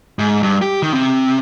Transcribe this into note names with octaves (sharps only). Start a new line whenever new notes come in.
G#2
G2
G4
D#3
C3